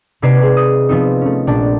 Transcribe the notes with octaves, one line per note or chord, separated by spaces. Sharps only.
C3 D#4 B4 D5 G#6 C7
G#4
D#6
F3 B3 C4 D#4
A3 C#4
A#1 D4 A5